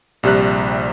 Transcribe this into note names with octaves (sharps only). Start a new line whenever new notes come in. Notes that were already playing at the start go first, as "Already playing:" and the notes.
A#1 C3 G3 F#6